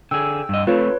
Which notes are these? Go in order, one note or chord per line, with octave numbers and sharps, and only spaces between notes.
D3 G#4 G5 E6
G2 D#5
A3 C4 F4 B4 C#5